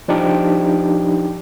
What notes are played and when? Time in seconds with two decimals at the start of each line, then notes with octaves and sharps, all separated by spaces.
0.08 F3 D4 D#4 G4